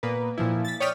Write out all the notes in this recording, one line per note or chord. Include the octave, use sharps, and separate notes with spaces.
A#2 A#3 B3 B4
A#2 F3 E4
A6 B6
C#5 D5 G5 D#6 F6 B6